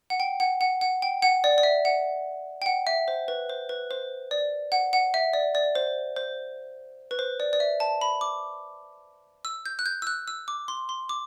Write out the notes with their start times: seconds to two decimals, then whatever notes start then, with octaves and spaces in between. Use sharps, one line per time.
0.10 F#5
0.20 G5
0.40 F#5
0.61 F#5
0.81 F#5
1.02 G5
1.22 F#5
1.44 D5
1.58 D5
1.63 E5
1.85 F#5
2.62 G5
2.66 F#5
2.87 E5
3.08 C5
3.28 B4
3.49 C5
3.69 B4
3.91 C5
4.31 D5
4.72 F#5
4.93 F#5
5.14 E5
5.33 D5
5.55 D5
5.75 C5
6.16 C5
7.11 B4
7.19 C5
7.40 D5
7.53 D5
7.60 E5
7.80 A5
8.01 B5
8.21 D6
9.45 E6
9.66 G6
9.79 F#6
9.86 G6
10.02 E6
10.07 F#6
10.28 E6
10.48 D6
10.68 C6
10.89 C6
11.09 D6